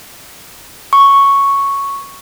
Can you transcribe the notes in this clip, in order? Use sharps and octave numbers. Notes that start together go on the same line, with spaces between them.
C#6